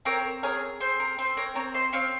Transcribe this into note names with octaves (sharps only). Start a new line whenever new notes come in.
C4 A#4 C#5
G#4 A#4 C#5
C4 C5
A#4
C4 C5
A#4 C#5
C4 A#4 C#5
C5 D#5
C4 C#5 F5